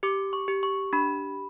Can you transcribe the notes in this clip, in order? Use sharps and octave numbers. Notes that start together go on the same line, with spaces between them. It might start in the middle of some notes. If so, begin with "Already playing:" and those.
G4 D6
C#6
G4
C#6
D4 B5